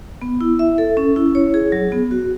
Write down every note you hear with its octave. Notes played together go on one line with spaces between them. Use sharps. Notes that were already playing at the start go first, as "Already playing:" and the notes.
B3
E4
E5
A4
C#4
E4
C#5
G#4
F#3
B3
F#4